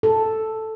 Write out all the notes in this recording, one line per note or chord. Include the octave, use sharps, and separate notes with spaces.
A4